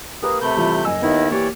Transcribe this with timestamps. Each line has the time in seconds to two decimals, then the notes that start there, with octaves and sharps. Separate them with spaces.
0.22 A#3 G4 A#4 B4 D#6
0.41 C3 A3 B5 G6
0.56 E3 G3 F4
0.85 F#1 D#5 G#5 E6
1.02 D#2 D#3 B3 D#4 E4
1.31 E3 A#3 G4 C#5 D5